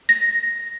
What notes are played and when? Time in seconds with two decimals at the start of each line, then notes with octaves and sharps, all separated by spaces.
0.09 A#6